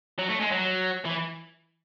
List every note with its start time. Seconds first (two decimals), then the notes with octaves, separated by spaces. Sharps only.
0.18 F#3
0.29 A3
0.40 G#3
0.51 F#3
1.05 E3